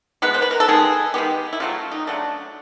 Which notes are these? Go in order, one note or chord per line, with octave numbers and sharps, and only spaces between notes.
B2 G#3 B3 B4
C5
B4
A#4
A4
D#3 G#3 B3 G#4
D#3 G#3 B3 G4
E4
C#3 F#3 A3 F4
D#4
C#3 F#3 A3 D4